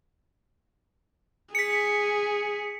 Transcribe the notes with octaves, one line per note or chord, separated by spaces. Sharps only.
G#4 B6 C#7